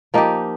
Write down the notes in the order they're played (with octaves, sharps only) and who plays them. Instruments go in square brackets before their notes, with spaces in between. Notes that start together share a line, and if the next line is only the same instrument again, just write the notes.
[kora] F3 A#3 D#4 G4